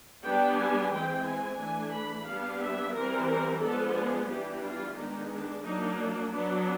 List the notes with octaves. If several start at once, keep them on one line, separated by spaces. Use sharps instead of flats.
G3 B3 D4 G5
G#5
E3 G#3 C4 G5
G#5
E3 A3 D4 G#5
B5
G3 B3 D4 F5
E5
E3 G3 C4 A#4
A#4
F3 G#3 B3 D4 A4
G#4
E3 G3 B3 D4 G4
F4
D#3 G#3 B3 D4 D#4
D4
F#3 A#3 D4 D#4
F#3 B3 D4